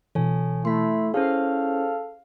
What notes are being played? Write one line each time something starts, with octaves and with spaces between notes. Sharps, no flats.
B2 E3 A4 C#5 G#5
A3 E4 C6 B6
C#4 E4 G#4 A4 C5 C#5 F5